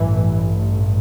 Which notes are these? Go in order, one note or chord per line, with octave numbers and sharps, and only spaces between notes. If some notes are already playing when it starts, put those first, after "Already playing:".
Already playing: A1 G2 E3